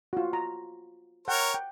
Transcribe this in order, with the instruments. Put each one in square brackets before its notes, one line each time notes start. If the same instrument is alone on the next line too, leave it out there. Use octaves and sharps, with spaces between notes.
[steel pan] F4 F#4
A#5
[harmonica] A#4 C#5 [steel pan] F#5 G5
[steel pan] G5